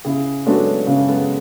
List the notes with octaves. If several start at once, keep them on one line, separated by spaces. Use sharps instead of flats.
C#3 E4 G#4
F#3 G#3 A3 B3 D4 F#4
C#3 F#3 A3
G#3 B3